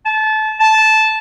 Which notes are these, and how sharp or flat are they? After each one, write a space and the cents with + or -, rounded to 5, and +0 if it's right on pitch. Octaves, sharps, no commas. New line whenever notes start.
A5 -25
A5 -10